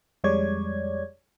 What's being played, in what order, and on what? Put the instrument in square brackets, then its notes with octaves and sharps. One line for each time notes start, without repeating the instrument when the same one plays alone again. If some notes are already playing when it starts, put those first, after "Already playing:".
[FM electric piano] F2 G3 G#3 C#5 D5 G#6